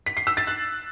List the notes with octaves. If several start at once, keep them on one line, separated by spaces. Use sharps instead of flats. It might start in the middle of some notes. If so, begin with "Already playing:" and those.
B6
C7
E6
A6
F#6